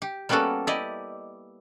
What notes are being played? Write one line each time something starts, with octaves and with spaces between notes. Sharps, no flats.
G4
G3 A#3 B3 C#4 F#4 A4
E4 G4 D5 D#5